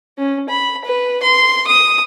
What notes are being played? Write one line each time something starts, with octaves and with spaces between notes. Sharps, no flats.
C#4
B5
B4
C6
D#6